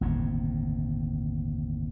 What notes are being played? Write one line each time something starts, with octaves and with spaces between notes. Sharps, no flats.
G1 D#2 A2 C3